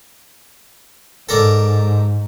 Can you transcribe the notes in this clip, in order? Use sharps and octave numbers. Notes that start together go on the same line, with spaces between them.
G#2 A4 A#4 D5